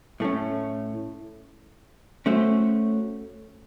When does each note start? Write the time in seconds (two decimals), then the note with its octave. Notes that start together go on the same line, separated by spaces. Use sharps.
0.20 A2 A3 C#4
2.26 A3 C#4 F#4 C5